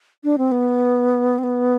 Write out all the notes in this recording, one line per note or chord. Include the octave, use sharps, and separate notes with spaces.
D4
C4
B3
C4
B3